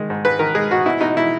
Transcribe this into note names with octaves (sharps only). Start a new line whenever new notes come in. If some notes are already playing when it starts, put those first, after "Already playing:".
Already playing: D#3 G#3
G#2
G#2 B4
D#3 A#4
G#3 G#4
G#2 F#4
B2 E4
B2 D#4
B2 E4